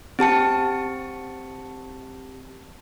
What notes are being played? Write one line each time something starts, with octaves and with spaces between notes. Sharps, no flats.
C4 G4 A5 C#7